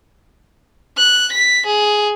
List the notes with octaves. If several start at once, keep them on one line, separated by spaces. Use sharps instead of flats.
F#6
B6
G#4